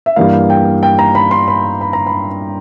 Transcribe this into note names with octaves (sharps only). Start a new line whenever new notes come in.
E5
G2 E3 G3 A#3 F5
G5
G5
A#5
B5
C6
B5
B5
A#5
B5